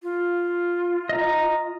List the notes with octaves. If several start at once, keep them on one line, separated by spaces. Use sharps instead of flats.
F4
D#5 A#5